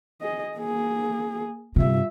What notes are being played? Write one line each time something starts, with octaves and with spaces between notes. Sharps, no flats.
G#4 D#5
A#3 G#4
G2 C3 F4 E5